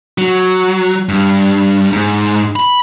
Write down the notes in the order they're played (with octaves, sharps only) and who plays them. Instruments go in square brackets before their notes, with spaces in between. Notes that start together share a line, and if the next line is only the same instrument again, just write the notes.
[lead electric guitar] F#3
G2
G#2
B5